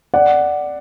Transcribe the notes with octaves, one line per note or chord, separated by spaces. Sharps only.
D5 F#5